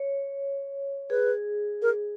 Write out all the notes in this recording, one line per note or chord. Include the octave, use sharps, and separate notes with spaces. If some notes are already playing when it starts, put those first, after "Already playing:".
Already playing: C#5
G#4 B4
A#4